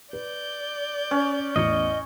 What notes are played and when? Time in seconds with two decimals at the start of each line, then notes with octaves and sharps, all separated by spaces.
0.13 B4 D5 G6
1.11 C#4
1.56 A1 E2 D#5 C#7